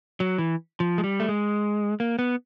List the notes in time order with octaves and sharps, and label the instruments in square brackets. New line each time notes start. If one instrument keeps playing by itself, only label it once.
[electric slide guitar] F#3
E3
F3
G#3
G3
A3
G#3
A#3
B3